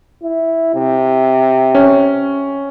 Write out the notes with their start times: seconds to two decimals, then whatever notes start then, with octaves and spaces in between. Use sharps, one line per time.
0.23 E4
0.75 C3
1.75 C#4